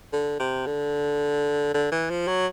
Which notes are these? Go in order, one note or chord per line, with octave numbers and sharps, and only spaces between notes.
D3
C3
D3
D3
E3
F3
F#3